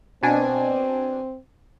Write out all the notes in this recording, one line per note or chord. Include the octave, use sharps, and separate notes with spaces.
B2 C4 D4 G#5